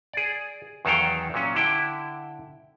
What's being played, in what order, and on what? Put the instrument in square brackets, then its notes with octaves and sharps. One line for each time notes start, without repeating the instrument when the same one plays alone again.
[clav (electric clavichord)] G#4 D5
E2 D#3 F#3 A4 F5 G5
A#2 F#3 C#4
D3 E4 G5